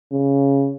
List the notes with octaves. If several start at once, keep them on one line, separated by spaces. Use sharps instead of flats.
C#3